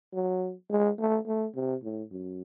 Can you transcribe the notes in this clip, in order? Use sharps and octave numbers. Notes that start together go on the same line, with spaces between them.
F#3
G#3
A3
A3
C3
A2
F#2